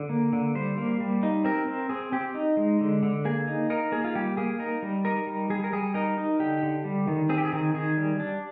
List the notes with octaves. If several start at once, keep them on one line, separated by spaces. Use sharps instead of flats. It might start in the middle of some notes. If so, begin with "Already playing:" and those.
Already playing: D3
A#3
D3
G3 C5
A#3
G3
D#4
C4 A#4
C4
C4 G#4
C4 G4
D#4
G#3
D3
D3
A#3 G#4
D#4
D#4 A#4
A#3 G#4
F4
G3 G4
A#3 G#4
D#4 A#4
G3
D#4 A#4
G3
G3 G#4
A#4
G3 G#4
D#4 A#4
D#4
D3 G4
D3
G3
D#3
C4 G#4
G4
G#4
D#3
D#3 G#4
G3
D4